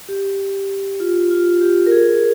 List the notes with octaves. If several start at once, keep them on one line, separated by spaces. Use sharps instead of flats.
G4
F4
F4
G4
A#4
G#4